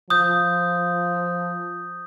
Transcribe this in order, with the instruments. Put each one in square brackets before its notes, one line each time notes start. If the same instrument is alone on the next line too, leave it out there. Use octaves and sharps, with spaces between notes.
[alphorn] F3 [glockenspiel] D#6 G6